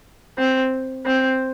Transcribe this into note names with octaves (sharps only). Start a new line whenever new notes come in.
C4
C4